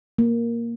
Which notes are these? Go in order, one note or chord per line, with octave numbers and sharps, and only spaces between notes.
A#3